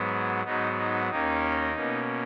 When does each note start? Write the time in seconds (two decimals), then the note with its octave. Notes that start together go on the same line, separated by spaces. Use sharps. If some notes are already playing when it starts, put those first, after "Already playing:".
Already playing: G#2 F#3 B3
0.45 G#2 F#3 B3 D#4
0.78 D#4
1.09 D#2 D#3 A#3 C#4 D#4
1.74 B2 A#3 C#4